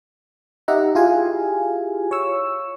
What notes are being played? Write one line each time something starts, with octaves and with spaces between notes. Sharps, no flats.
D#4 G4 E5 F#5 A#5
E4 F4 G4 G#4 F5 G#5
C#5 C#6 E6